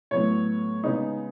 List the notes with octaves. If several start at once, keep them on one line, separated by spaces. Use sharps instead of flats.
A2 F#3 B3 C#5
C#3 G#3 B3 D#4